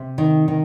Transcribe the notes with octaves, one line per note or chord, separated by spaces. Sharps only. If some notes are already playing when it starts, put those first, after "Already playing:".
Already playing: C3
D#3
D#3